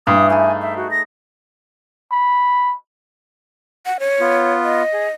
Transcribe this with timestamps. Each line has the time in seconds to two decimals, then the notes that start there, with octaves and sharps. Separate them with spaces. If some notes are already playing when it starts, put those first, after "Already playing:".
0.07 G2 E3 D#6
0.30 A3 D#4 G#4 G#5
0.62 E5
0.77 F#4
0.91 A#6
2.12 B5
3.86 F#5
4.00 C#5
4.20 B3 F4
4.64 D#5
4.93 G#4